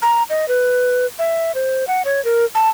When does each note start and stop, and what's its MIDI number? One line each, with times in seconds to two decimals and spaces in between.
0.02 0.23 82
0.30 0.48 75
0.48 1.06 71
1.19 1.52 76
1.55 1.85 72
1.88 2.02 78
2.05 2.23 73
2.25 2.45 70
2.55 2.70 81